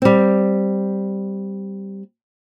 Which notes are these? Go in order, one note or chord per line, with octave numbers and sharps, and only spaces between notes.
G3 C4